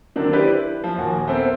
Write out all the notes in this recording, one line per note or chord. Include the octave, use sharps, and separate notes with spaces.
D3 D#3 F#3 A#3 C4 D4
E4 G4 B4 C5 D5
E4
F3
D#2 A#2 F3 F#4 G#5
B3 C4 A4 A#4 C5 E5